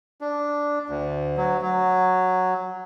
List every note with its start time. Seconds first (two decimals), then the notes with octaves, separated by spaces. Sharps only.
0.21 D4
0.89 D2
1.37 F#3
1.61 F#3